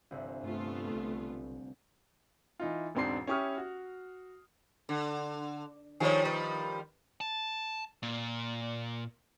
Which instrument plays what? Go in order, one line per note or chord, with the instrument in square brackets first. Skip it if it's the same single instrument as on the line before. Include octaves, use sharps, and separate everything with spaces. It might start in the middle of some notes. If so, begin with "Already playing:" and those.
[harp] G1 C2
[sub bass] G2 [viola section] A3 B3 F4
[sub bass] B1
[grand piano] E3 D#4 F4
E1 G#2 C4 D4 C6 C7
C#4 E4 G4 C#6 D#6 F6
F#4
[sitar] D3
[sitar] D#3 F3 G3 [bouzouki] G#4 C#5
[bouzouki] B4
[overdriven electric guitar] A5
A#2